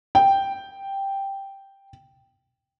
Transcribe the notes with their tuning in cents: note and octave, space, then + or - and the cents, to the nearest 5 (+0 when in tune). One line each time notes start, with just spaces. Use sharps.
G5 +0